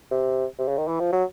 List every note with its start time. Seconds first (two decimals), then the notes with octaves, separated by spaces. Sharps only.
0.11 C3
0.59 C3
0.68 C#3
0.78 D#3
0.88 E3
1.00 F3
1.12 F#3